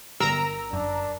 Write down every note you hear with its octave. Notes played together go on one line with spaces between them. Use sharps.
G1 A#4 A#5 E6
F#2 D4